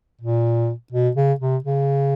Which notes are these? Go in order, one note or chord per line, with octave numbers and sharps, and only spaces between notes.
A#2
B2
C#3
C3
C#3